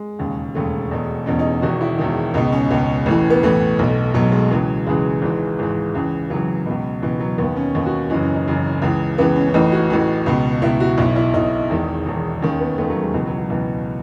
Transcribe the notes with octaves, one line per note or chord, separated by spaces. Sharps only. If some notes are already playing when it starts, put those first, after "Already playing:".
Already playing: G#3
E1 D#2 C#3
E1 D#2 C#3 A3
E1 E2 B2
E1 E2 B2 C#4
D#4
E1 E2 D#3 F#4
E4
E1 E2 D#3
C#2 B2 D#4
C#4
C#2 B2
A1 A2 E3
B3
A1 A2 E3 A3
B1 B2
B1 B2 F#3
G#3
C#2 C#3 E3 F#3
C#2 C#3 E3 G#3
G#1 G#2 E3
G#1 G#2 E3
C#2 C#3 E3
C#2 C#3 E3 F#3
C#2 B2
C#2 B2 E3
F#3
D#2 D#3 B3
C#4
D#2 D#3 D#4
F#4
F#1 F#2 E3 D#4
C#4
D#4
F#1 F#2 E3
C#2 C#3 E3
C#2 C#3 E3 B3
C#4
C#4
A1 A2 E3 D#4
F#4
A1 A2 E3
C#2 B2
C#2 B2 E4
F#4
B1 B2 E4
E4
B1 B2 D#4
E1 E2 D#3
E1 E2 D#3
D#2 D#3 C#4
B3
D#2 D#3 A3
F#3
G#3
C#2 B2 E3
F#3
F#3
C#2 B2 E3